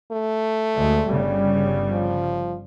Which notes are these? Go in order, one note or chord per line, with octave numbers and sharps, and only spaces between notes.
A3
D2 G#3
G1 C#3 G3
F3